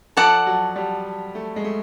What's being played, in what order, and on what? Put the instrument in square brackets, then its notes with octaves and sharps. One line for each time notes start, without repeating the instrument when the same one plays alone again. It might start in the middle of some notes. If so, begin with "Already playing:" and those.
[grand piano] F3 [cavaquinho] A4 D5 F#5 A5
[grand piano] F#3
G3
A3
G#3
A3